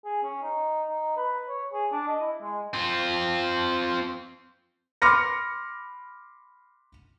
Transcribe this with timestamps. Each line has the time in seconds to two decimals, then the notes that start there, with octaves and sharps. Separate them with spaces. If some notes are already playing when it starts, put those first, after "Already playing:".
0.05 G#4
0.23 C#4
0.43 D#4
0.89 D#4
1.17 B4
1.48 C#5
1.73 G#4
1.92 D4
2.08 D#5
2.21 E4
2.41 G#3
2.73 C4 F4
5.02 B5 C6 D6 F6 A#6 C#7